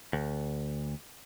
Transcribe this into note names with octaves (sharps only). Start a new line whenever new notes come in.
D2